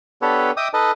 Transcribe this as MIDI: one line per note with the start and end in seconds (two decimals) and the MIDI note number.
0.22 0.51 59
0.22 0.51 62
0.22 0.51 67
0.22 0.51 69
0.22 0.51 71
0.22 0.51 73
0.57 0.68 75
0.57 0.68 76
0.57 0.68 79
0.57 0.68 86
0.57 0.68 87
0.74 0.92 63
0.74 0.92 69
0.74 0.92 71
0.74 0.92 75
0.74 0.92 81